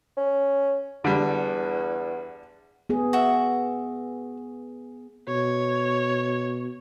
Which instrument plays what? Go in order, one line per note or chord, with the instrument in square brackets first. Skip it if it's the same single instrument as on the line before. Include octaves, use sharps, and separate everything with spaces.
[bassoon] C#4
[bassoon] E2 [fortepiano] D3 G3
[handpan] B3 G#4
[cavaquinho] F#4 E5
[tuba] B2 [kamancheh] C#5